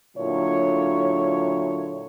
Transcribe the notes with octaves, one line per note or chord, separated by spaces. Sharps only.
A#2 D3 F#3 E4 C#5